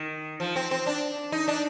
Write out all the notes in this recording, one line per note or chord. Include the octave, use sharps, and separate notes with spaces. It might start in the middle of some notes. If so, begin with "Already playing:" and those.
Already playing: D#3
F3
C4
C4
D4
D#4
D4